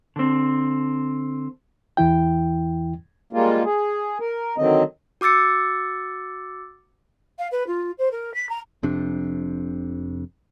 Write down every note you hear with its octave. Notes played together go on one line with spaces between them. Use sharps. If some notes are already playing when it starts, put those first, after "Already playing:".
D3 C4
E2 E3 E4 G5
G3 G#3 A#3 F4
G#4
A#4
D3 D#3 F#3 C4 D#5
F#4 D6 E6 A6 C#7
F5
B4
F4
C5
A#4
B6
A#5
F1 F2 C3 D4